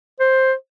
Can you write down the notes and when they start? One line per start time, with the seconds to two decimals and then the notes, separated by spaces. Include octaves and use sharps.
0.20 C5